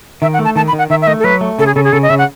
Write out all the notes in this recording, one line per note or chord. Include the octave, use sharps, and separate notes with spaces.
D#3 E5
F#5
A3
A5
D#3 A5
B5
D#3
F#5
D#3 E5
E5
A3 D#5
A4
F#3 B4
A3
C#3 A4
G#4
C#3 A4
G#4
C#3 A4
D#5
C#3 E5
F#5